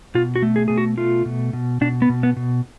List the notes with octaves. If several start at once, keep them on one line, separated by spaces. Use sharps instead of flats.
B2 F4
F#4
A3
G#4
B2 G#4
F#4
A3 F4
B2
B2
B2 D4
B3
B2
B3
B2